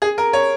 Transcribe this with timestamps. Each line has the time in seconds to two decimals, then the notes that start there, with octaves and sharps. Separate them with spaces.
0.02 G#4
0.18 A#4
0.33 C#5